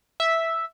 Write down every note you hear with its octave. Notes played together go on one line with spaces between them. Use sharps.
E5